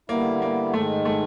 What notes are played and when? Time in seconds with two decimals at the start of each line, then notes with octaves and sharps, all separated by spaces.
0.09 D3 G3 A#3 B3 E4
0.42 A#3
0.73 G#2 D#3 G#3 A3
1.05 A3